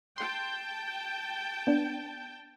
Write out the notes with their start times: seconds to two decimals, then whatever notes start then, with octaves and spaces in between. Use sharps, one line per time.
0.18 G5 A5 C6
1.67 B3 D4